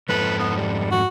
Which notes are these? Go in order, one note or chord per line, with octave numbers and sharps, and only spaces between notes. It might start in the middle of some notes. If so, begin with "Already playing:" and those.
F2 G#2 A4 B4
B3
G3
F#4